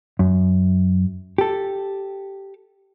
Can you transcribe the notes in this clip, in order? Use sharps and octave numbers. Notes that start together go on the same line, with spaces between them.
F#2
G4 A4